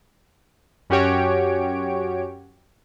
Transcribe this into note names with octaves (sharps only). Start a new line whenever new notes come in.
F#2 C#4 F#4 G4 C#5 D7